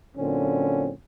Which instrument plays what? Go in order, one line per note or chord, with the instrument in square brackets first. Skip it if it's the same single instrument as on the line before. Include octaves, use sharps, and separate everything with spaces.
[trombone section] A#2 D3 F#3 C4 C#4